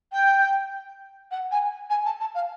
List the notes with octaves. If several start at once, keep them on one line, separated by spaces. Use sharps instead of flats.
G5
F#5
G#5
G#5
A5
A5
F5